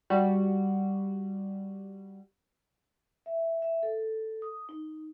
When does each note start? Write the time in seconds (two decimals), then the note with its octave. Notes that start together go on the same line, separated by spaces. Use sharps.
0.10 G3 F#4
3.26 E5
3.62 E5
3.83 A4
4.42 D#6
4.69 D#4